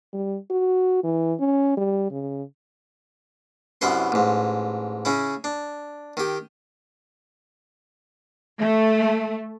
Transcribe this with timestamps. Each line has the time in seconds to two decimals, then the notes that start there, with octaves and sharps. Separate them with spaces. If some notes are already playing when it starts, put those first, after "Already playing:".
0.13 G3
0.51 F#4
1.03 E3
1.39 C#4
1.77 G3
2.11 C#3
3.81 C2 F#2 B3 E4 B4 C6
4.12 A1 G#2
5.05 C#3 C#4 E4
5.44 D4
6.17 D#3 G4
8.60 A3